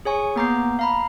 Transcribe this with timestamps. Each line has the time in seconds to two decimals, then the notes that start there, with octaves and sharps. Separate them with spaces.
0.05 G#4 C#5 G#5 C#6
0.36 A#3 B3 A#5 D6 G6 C7
0.79 F5 A#5 B5